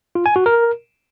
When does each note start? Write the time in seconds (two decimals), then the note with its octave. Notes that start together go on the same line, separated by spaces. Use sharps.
0.15 F4
0.26 G#5
0.36 F#4
0.46 A#4